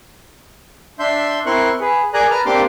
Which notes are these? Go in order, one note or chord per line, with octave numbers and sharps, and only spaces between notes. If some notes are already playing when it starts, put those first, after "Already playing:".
D4 E5 C6 G6
C4 E4 A#4 C6 C#6 F#6
G#4 B4
G#4 A#4 D5 G#5 A#5 F#6
B4 A5 A#5 F6
A#3 C4 D4 G4 C6 D6